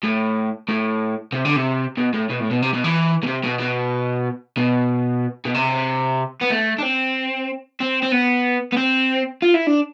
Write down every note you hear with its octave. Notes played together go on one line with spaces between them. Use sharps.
A2
A2
C3
D3
C3
B2
A2
B2
A2
B2
C3
B2
E3
B2
C3
B2
B2
B2
B2
C3
B3
A3
D4
C4
C4
C4
B3
B3
C4
F4
E4
D4